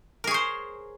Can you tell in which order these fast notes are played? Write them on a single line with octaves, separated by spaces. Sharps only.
A#4 G#4 C#5 C5